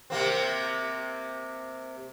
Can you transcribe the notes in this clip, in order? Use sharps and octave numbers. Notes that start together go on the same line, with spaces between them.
C3 A#3 C4